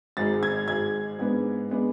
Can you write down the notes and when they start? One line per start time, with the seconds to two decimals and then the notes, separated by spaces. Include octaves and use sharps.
0.17 G#1 G#2 G#3 A6
0.43 G#6
0.68 G#1 G#2 G#3 G#6
1.19 G#2 G#3 B3 D4
1.71 G#3 B3 D4